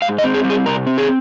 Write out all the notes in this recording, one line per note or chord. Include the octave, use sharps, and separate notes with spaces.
G#2 F5
D#5
C4
G#4
G3
G#4
C3 A#4
C4
G#4